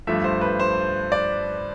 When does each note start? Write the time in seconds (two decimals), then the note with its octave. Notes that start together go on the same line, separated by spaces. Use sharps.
0.07 G2 F3 A3 E5
0.24 C5
0.41 B4
0.60 C5
1.12 D5